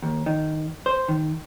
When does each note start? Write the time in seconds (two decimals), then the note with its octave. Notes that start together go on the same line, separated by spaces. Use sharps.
0.02 D#2
0.26 D#3
0.86 C5
1.08 D#3